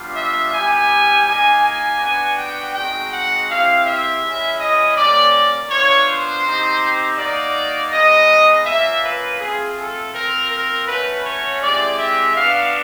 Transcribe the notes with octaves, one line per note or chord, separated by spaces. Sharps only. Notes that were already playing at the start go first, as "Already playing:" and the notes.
Already playing: G3 B3 D4 F4
E5
G3 B3 E4 G4 G#5
A#3 D#4 G4 G#5
G#5
B3 D4 F#4
G5
G#3 C4 D#4 F#4 G5
F#5
C4 E4 G4 F5
E5
G#3 C#4 E4
D#5
G3 A#3 C#4 D5
B3 D4 F4 C#5
C5
C4 D#4 G4
A#3 D#4 F#4 D5
G#3 B3 D#4 D#5
A#3 C#4 F4 E5
B4
A3 C4 F4 G#4
A4
C4 F4 A#4
A#4
A3 C#4 F#4 B4
C#5
G#3 C4 E4 G4 D5
E5
B3 D4 F#4 F5